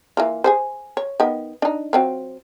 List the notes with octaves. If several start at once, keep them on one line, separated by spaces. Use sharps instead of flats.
E3 A#3 F4
G#4 A4 C5
C#5
D#3 B3
D4 D#4
F#3 C4 F4